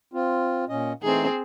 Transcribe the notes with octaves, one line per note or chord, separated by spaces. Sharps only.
C4 F4
A#2 C#4 D#5
E3 A3 C4 D#4 G#4